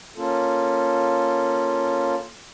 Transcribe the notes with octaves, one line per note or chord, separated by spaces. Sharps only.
A#3 C#4 F4 A4